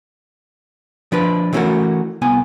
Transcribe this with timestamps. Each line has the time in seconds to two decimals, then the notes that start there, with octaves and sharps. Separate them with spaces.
1.12 F3 D4 B4
1.53 E3 A3 C#4 F4 F#4 A#4
2.22 C2 B3 G#5